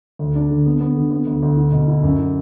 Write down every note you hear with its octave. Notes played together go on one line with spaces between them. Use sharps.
D2
D4
D3
B3
B3
D3
B3
D2
D2
E4
B2
E4
F#2
E4